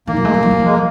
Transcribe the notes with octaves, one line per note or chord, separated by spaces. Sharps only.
D#3 A#3
F#3
G#3
F#3
F3
F#3
F3
G#3
A#3